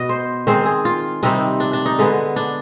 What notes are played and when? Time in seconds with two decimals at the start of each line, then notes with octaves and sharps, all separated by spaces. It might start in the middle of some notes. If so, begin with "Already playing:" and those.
Already playing: B2 B3 D#5
0.09 C5
0.47 D#3 G#3 C4 C5
0.66 G#4
0.85 F4
1.23 C3 D#3 G3 C4 D#4
1.60 D4
1.73 D4
1.86 D#4
1.99 D3 G#3 B3
2.36 D4